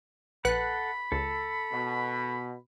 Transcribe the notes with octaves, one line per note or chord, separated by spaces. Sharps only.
A#1 A4 B4 F#5 B5 F#6
C#2 A4
B2